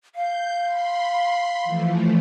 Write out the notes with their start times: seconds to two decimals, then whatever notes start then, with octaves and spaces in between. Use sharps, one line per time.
0.15 F5 G6
0.64 B5 C6
1.64 E3 F3 A3